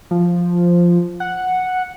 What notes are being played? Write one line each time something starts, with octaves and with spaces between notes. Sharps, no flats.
F3
F#5